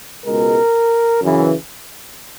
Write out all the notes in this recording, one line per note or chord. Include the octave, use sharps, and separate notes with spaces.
C#2 B2 G#3 A#4
F#2 C#3 E3